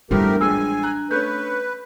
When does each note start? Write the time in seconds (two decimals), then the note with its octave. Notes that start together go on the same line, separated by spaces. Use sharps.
0.11 F3 G3 A3 B3 D4 E4 G4 A#4
0.41 A1 F3 G#3 G#5 E6
0.83 A#5 F#6
1.11 A3 C#4 B4 F#6 G6